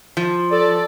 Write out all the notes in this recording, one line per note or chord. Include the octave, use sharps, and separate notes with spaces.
F3
A4 D5